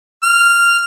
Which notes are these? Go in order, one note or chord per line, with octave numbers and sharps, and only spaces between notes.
F6